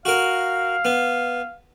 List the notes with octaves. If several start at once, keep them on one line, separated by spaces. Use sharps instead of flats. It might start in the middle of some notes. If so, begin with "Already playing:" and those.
F#4 A#4 F5
B3